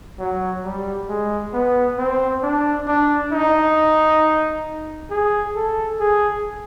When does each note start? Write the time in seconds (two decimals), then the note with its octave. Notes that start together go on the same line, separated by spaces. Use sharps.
0.19 F#3
0.64 G3
1.09 G#3
1.53 B3
1.98 C4
2.43 D4
2.87 D4
3.32 D#4
5.11 G#4
5.56 A4
6.00 G#4